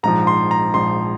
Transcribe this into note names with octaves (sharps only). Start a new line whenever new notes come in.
A#1 G#2 F3 A#5
C6
A#5
A#1 G#2 F3 C6